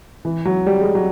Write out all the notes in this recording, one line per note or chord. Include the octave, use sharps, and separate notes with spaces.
E3
F#3
G3
G#3
F#3